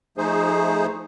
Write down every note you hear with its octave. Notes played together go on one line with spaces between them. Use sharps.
F3 A3 D#4 G#4 C5